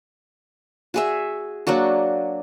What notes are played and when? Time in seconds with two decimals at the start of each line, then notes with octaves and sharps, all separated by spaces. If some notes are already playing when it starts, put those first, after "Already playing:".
0.94 F#4 G#4 E5
1.67 F#3 A#3 D4 F#4